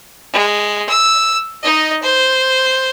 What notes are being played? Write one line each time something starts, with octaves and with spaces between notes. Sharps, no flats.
G#3
E6
D#4 D#5
C5